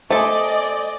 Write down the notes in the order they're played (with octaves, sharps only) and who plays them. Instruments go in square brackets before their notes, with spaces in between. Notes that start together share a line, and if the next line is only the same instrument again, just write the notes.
[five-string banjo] A3 A4 [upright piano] C5 G#5 [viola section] D5 D#5